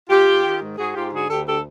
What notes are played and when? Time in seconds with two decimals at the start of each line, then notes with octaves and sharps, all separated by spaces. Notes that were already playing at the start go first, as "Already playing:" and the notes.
0.09 G#2 F4 G4
0.26 G#2
0.44 D#3
0.61 G#2
0.77 G#2 F#4 G#4
0.95 G#2 F4 G4
1.12 D3 F#4 G#4
1.29 D2 G4 A4
1.46 D3 G4 A4